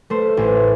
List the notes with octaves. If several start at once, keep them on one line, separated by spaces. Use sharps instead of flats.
A3 C5
A1